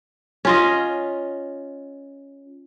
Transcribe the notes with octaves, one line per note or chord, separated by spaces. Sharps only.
C#4 F4 D#5